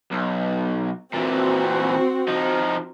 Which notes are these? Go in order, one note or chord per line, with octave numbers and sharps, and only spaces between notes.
B1
A#2 E3 C4 F#4
F3 D#4